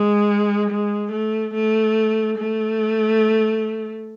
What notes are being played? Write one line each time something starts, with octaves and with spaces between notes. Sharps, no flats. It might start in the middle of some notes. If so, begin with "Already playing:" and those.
Already playing: G#3
G#3
A3
A3
A3